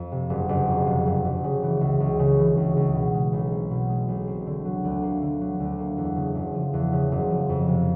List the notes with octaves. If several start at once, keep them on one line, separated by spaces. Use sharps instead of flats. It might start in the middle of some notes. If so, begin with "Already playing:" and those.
Already playing: F2
C3
F#1
F#1
F2
C3
F#1
F#1
C#3
E3
C#2
C#2
C#3
E3
C#2
C#2
B2
G#3
B1
C4
B2
G#3
B1
C4
D3
F#3
D2
A#3
D3
F#3
D2
A#3
E2
C#3
F#1
F3
E2
C#3
F#1
F3
F2
C3